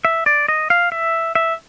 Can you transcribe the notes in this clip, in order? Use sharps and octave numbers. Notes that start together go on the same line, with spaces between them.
E5
D5
D#5
F5
E5
E5